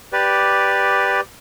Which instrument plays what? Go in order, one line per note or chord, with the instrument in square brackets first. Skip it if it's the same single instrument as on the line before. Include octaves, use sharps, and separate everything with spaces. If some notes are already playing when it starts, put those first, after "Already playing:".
[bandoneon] G4 B4 D5